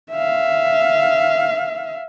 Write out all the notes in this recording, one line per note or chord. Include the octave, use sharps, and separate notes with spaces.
E5 F5